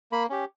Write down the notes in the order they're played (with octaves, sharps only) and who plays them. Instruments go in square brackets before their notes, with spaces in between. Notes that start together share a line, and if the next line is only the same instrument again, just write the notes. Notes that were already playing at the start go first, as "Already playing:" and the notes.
[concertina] A#3 B5
C#4 G4